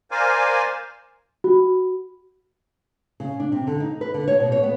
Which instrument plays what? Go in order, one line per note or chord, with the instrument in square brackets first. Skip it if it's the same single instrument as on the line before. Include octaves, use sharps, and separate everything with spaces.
[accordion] A#4 C5 D5 F5 G#5
[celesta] F#4
[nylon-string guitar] C#3
D4
C3
D3
D#4
B4
D3
C#5
B2
C#5
B3